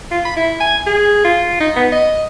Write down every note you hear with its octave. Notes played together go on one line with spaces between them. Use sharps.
F4
B5
E4
G#5
G#4
F4
D#4
B3
D#5